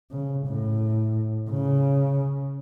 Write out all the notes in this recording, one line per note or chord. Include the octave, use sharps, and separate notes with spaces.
C#3
A2
C#3